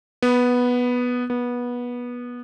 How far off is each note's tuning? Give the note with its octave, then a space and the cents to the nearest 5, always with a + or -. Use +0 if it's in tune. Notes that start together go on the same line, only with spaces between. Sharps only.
B3 -5
B3 -20